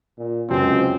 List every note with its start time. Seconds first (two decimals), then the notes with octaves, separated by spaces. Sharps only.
0.18 A#2
0.50 C#2 F#2 C3 C4